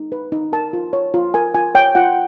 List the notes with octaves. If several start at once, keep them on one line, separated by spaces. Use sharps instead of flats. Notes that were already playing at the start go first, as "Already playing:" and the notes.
Already playing: D#4
B4
D#4
A#4 A5
F4
C#5
F4
A#4 G#5
F4 G#5
C#5 G5
F4 F#5